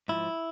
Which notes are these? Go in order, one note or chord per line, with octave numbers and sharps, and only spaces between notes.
G#2 F3 E4